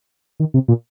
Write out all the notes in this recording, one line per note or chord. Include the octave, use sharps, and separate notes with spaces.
D#3
C3
A#2